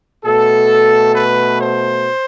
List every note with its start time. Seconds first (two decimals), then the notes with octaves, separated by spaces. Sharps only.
0.25 B2 A3 A4
1.15 B4
1.61 C5